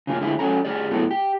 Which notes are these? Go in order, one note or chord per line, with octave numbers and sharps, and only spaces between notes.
C#3 F3 A#3 C#4
F2 D3 G#3 A#3 E4
F#3 C#4 A4 A#5
F2 G4 G#4 D5
A2 F#3 G#3 B3 E4 A4
G4